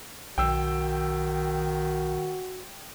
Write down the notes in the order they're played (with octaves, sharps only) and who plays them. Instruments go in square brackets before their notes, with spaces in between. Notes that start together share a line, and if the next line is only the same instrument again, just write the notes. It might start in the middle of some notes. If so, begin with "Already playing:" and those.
[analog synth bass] B1 [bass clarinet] D#3 [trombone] F#4 [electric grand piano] G5 E6